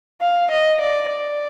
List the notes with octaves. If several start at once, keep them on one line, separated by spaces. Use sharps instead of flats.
F5
D#5
D5
D5